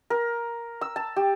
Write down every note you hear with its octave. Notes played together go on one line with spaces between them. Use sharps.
A#4
E6
A5
G4